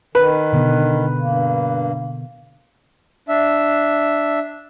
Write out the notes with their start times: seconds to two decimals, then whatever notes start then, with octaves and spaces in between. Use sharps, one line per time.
0.15 D#3 B4
0.53 B2 D3 B3
1.19 G2 A#3
3.28 D4 E5